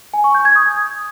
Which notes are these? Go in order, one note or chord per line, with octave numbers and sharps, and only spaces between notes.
G#5
C#6
G6
G#6
D#6